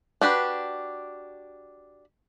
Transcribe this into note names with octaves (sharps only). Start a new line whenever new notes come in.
D4 F#4 G4 B4